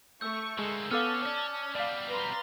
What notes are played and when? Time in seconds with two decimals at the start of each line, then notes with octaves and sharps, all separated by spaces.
0.21 A3 C#6 E6 G6
0.59 D3 G#3 A#3
0.91 B3 C#4 A4 F5 A5 D6 F6
1.26 C#4 D5
1.75 B2 G3 D5 F5
2.08 B4 A#5 C6